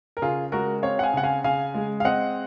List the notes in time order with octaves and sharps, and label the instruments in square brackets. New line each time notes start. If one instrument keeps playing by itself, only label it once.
[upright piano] A#4
[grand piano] C#3 [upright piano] F4 G#4
[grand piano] G#3 [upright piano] F#4 A#4
[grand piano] C4 [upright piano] C#5 F5
[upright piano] F#5
F5 G#5
[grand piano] C#3 [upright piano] F#5
[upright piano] F5 G#5
[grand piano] C#3 [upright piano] F5 G#5
[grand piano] G#3
[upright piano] F5
[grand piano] C4 [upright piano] D#5 F#5